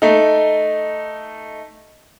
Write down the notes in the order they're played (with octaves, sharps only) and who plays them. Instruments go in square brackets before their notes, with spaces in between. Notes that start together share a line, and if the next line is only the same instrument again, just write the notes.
[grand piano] A3 D#4